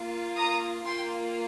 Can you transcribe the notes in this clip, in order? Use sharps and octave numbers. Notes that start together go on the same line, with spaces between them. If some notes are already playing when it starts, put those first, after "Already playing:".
Already playing: A#3 F4
A#5 D#6
A#3 F4 G5 C6